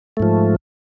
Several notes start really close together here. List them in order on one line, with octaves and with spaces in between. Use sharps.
A3 G#2 F3